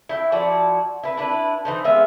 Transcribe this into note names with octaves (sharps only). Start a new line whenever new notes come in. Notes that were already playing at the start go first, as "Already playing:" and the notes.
E4 G5
F3 E4 F#4 D5
E4 B4
D4 E4 B4
E3 D#4 C5
G#3 B3 E5 F5